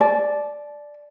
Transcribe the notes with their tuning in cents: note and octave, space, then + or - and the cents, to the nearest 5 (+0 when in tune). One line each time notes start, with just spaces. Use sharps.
D5 +0 A5 -30